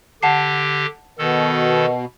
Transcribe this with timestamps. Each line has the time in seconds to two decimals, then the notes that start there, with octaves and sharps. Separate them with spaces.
0.23 D3 G4 F#5 A5 C7
1.18 B2 D#3 A4